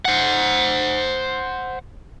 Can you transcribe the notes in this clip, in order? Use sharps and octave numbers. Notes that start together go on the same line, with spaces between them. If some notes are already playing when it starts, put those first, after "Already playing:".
C5 F#5